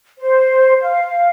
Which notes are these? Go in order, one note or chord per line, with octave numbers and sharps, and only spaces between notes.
C5
F5